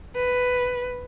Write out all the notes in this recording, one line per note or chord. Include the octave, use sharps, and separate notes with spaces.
B4